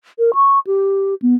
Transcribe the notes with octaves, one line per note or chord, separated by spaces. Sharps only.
A#4
C#6
G4
B3